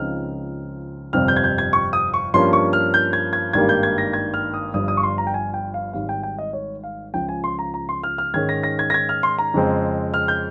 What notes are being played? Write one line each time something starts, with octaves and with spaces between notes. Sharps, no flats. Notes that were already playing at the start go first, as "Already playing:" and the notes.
Already playing: C#2 C#3 F3 C4 D#4 F6
G1 F2 C3 G3 C4 F6
G6
G#6
G6
G#6
C#6
D#6
C#6
G2 F3 A#3 C#4 C6
C#6
F6
G6
G#6
G#6
G#1 G2 D#3 G3 A#3 G#6
G6
G#6
A#6
G#6
F6
D#6
G1 G2 F3 D#6
D#6
C#6
C6
A#5
G5
G#5
G5
F5
G#1 G#2 G3 F5
G5
G5
D#5
C#5
F5
C#2 C#3 F3 G5
G#5
C6
A#5
A#5
C6
F6
F6
G#2 D#3 G#3 C#4 G#6
A#6
A#6
G#6
A#6
G#6
F6
C6
A#5
F2 C#3 G#3 C4
F6
G6